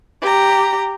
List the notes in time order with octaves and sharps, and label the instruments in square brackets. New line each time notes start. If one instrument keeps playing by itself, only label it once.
[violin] G4 A#5